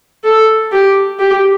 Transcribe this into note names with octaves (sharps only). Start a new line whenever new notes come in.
A4
G4
G4